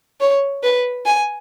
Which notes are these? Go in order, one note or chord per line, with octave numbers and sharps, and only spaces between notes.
C#5
B4
G#5